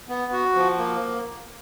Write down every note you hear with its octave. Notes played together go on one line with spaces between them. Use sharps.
B3
F#4
F3
A#3